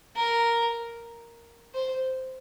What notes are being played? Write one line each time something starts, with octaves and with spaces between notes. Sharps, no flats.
A#4
C5